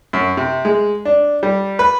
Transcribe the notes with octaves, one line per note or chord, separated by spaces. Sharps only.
F#2
C3
G#3
D4
G3
B4